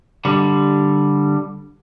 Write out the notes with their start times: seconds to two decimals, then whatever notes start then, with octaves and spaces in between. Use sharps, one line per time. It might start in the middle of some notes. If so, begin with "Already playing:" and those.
0.25 D3 G3